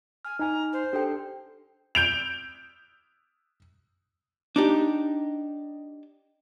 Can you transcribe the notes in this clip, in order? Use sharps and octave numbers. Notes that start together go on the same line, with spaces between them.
G#5 F6
D#4 G#5 A#5
C5
D4 G4 A4 G5
G6 D7 F7
D4 D#4 G4